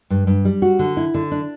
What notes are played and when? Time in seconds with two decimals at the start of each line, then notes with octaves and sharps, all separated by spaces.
0.10 G2
0.27 G2
0.45 G3
0.62 F#4
0.79 D3
0.97 E4
1.14 D3
1.32 D4